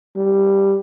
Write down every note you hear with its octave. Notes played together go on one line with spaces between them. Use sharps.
G3